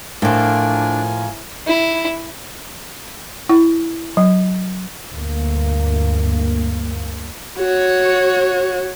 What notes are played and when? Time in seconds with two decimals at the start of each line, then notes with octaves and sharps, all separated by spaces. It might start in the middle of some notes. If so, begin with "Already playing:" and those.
0.22 A2 F3 A#3 D4 G#5
1.67 E4
3.49 E4
4.17 F#3
5.12 D2 G2 A#3
7.58 F#4 C#5